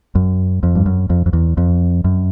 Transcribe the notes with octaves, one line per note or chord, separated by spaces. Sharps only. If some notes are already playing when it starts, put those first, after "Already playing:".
F#2
F2
G2
F#2
F2
F2
E2
F2
F#2